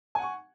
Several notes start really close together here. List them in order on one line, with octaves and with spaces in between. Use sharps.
G#5 F#5 C#6